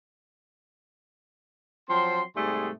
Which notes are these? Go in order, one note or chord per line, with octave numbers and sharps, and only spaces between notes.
F3 F#3 C4 C6
G#2 C3 G3 A3 G#4 C6